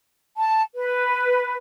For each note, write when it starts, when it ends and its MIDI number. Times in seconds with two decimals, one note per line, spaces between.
0.37 0.62 81
0.74 1.55 71